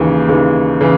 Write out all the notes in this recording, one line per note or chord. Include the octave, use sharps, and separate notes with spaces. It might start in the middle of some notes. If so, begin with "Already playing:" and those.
Already playing: D#2 C#3 E3
D#2 C#3 E3
C#3 E3